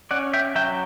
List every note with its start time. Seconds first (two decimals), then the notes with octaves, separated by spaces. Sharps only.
0.11 C#4 D5 F#5
0.33 E5 G5
0.56 F#3 E5 G5